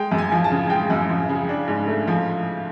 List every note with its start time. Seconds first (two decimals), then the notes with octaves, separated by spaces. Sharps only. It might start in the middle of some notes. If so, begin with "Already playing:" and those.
Already playing: G#3 G5
0.12 F#2
0.18 G#5
0.32 F3
0.44 A5
0.51 C#3
0.70 G#3 G5
0.90 F#2
1.09 F3
1.29 C#3
1.49 D4
1.68 G#2
1.88 A3
2.07 F3